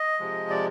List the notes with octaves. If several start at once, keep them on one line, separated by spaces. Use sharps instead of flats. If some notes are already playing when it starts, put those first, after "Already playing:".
Already playing: D#5
C3 F3 G#3
D5